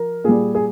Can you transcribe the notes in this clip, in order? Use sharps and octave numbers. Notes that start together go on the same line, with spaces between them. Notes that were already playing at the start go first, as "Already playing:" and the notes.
Already playing: F3 A#4
A#2 G3 G#4
G#4